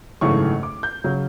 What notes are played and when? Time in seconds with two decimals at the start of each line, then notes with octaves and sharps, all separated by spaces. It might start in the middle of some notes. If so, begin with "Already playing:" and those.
0.21 G#1 F#2 C#3 E3 A3 C#6
0.63 D6
0.83 G6
1.04 C#3 F#3